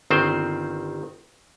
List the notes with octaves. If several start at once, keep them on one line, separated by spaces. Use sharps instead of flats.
G1 D#3 C4 C5